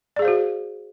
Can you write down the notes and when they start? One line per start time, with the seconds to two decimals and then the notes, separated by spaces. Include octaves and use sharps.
0.16 D5
0.19 G#4
0.22 F5
0.25 C5
0.28 F#4